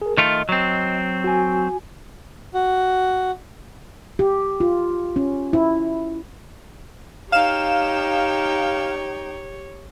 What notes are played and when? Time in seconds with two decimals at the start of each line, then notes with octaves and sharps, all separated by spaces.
0.02 G#4 A#4
0.17 D#3 A3 F4 D#5
0.49 F#3 C4
1.24 F#4 G#5
2.54 F#4
4.19 G4
4.60 F4
5.16 C#4
5.53 E4
7.32 D#4 G4 C#5 F5 G5 E7